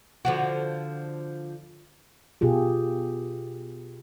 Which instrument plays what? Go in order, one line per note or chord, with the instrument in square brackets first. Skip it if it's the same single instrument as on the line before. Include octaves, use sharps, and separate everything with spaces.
[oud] D3 F3 F#4
[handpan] B2 F4 G4 G#4